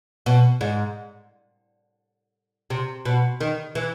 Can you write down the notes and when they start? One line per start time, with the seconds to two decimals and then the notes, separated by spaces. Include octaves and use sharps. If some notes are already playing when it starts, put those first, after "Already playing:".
0.26 B2
0.61 G#2
2.70 C3
3.05 B2
3.41 D#3
3.75 E3